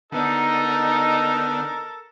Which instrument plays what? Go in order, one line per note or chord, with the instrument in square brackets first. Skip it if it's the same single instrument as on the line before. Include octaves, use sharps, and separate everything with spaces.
[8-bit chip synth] D3 B3 D4 [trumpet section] D#4 [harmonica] A4 A#4